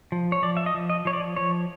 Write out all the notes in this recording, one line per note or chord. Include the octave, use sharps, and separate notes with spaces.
F3
C#5
F3 D5
E5
D#5
F3
D#5
F3 C#5
D5
F3 C#5